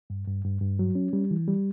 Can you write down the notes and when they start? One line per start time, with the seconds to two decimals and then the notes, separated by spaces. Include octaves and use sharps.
0.10 G2
0.28 G2
0.45 G2
0.61 G2
0.79 F#3
0.95 C#4
1.13 G3
1.31 E3
1.48 G3